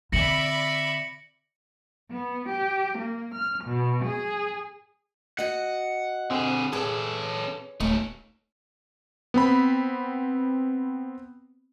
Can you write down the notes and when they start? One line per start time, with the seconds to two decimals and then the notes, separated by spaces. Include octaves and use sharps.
0.12 D3 C4 D5 E5 B5 A#6 C#7 F#7
2.11 B3
2.50 G4
3.00 A#3
3.35 F6
3.65 B2
4.06 G#4
5.38 F#4 D#5 F#5
6.31 D3 C4 G#4
6.72 C#4 G#4 A4 B4 C#5 G#5
7.80 D#1 A3 C#4 D#4
9.34 B3 C4 B5